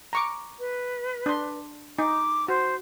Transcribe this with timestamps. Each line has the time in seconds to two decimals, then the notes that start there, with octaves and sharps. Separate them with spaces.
0.13 A#5 C#6 D6
0.59 B4
1.26 D4 C6
1.99 D#4 D6
2.48 F#4 C5